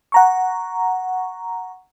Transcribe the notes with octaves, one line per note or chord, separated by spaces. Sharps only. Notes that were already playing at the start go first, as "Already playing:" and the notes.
F#5 A#5 C#6